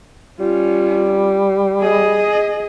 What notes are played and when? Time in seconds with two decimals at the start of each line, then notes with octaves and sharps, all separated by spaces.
0.40 G3 C#4 F4
1.80 G#4 D#5